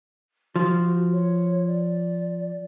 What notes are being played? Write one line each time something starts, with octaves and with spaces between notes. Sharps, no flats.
F3 F#4
C#5
D5